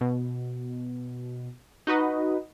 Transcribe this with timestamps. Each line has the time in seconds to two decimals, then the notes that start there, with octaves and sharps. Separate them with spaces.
0.01 B2
1.87 D#4 F#4 B4 D#5